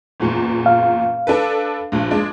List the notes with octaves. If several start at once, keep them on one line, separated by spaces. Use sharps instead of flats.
F#1 E2 A#2
F5
D4 A4 B4
A#1 G2
G#3 D4